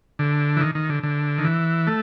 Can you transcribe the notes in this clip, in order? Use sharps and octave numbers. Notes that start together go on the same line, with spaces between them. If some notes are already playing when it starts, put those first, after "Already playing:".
D3
E3
D#3
D#3
D3
D3
D#3
E3
A3